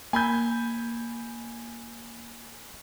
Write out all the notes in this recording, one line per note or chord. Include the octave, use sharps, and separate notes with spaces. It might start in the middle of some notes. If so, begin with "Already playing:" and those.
A#3 G#5 B5 G6